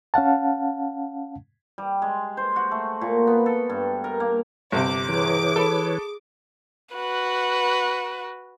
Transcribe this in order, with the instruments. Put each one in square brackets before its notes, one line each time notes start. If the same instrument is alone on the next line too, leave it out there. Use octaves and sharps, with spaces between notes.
[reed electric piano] C#4 F5 F#5 A5
[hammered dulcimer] G3
G#3
C5
F#4
A3
A#2
B3
A4
G2
A#4
A#3
[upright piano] G1 C3 [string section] D6
[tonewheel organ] E3 B4 C#5 [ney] G#4
[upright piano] A4 B5
[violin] F#4 B4